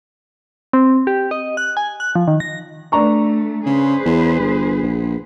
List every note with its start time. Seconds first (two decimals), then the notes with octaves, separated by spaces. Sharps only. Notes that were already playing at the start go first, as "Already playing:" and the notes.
0.73 C4
1.07 G4
1.31 D#5
1.57 F#6
1.77 G#5
2.00 F#6
2.15 F3
2.28 D#3
2.40 A#6
2.92 A3 D4 A#5 C#6
3.66 C#3 G#4 B4 C5
4.05 E2
4.40 G1
4.83 A#1